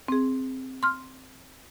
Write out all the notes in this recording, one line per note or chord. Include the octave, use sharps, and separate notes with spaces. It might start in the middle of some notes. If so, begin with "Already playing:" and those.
C4 G#4
C6 F6